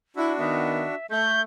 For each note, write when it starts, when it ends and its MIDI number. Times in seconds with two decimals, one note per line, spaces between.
0.16 0.95 62
0.16 0.32 64
0.16 0.95 66
0.38 0.85 51
0.38 0.85 59
0.38 1.06 76
1.10 1.41 57
1.10 1.41 91